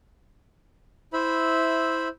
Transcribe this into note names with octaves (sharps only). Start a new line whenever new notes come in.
E4 C5 E5 B5